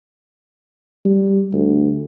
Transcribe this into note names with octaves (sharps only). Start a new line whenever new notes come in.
G3
D2